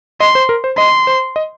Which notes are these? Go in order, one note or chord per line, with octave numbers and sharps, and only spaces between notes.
D#5 C6
C5
A#4
C5
D#5 C6
C5
D#5